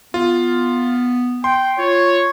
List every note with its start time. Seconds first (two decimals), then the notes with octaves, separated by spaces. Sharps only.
0.14 B3 F4
1.44 G5 C6
1.78 F4 C#5